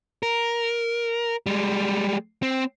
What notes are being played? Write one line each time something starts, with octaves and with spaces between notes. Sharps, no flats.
A#4
G3 G#3
C4